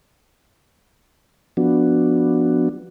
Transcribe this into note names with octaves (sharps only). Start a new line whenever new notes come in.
F3 B3 D4 F#4